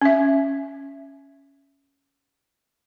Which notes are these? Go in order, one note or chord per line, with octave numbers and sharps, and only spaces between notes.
C#4 E5